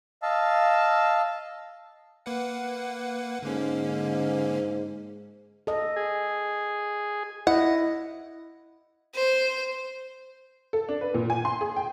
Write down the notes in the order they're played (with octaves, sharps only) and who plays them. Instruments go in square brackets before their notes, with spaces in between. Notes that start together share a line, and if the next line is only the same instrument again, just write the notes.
[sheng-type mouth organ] D#5 F5 A5 E6
[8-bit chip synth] A#3 B4 F#5
[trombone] G#2 [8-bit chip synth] D3 A#3 C#4
[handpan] A4 D#5
[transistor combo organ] G#4
[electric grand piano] E4 [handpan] D#5 [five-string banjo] F#5
[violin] C5
[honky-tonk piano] A4
D4
B4
A#2
G#5
C6
G#4
G5